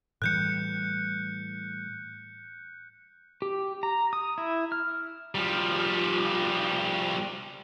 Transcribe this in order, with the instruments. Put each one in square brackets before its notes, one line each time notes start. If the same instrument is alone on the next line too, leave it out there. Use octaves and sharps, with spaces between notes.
[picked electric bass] A2 E3 G3 [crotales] F#6 G6 C#7
[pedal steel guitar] G4
A#5
D#6
E4
F6
[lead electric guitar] F3 G3